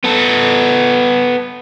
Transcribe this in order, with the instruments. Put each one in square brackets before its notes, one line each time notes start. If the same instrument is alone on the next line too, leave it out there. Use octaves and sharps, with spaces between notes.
[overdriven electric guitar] B3 A4